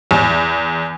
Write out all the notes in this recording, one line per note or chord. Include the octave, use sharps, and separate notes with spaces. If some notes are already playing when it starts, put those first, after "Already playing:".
E2